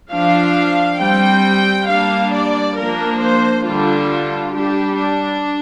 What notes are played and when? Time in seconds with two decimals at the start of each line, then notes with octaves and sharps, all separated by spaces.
0.12 F3 D4 F5
1.00 G3 C4 G5
1.88 G3 A#3 D4 F5
2.33 D5
2.77 F3 A#3 D4 A#4
3.21 C5
3.65 D3 G3 D4 F4
4.53 G3 D4 G4
4.97 D4